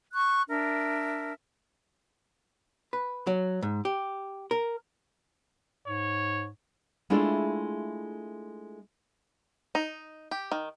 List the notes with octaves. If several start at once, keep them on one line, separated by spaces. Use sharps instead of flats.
C#6 F#6
D4 A#4 E5
B4
F#3
G#2
G4
A#4
G#2 C#5
G#3 A3 D4 E4 F4
D#4
G4
D#3